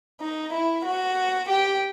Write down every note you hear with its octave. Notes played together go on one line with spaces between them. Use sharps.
D#4
E4
F#4
G4